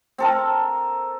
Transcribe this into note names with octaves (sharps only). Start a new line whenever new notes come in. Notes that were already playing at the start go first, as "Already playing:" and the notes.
C4 A4 A#4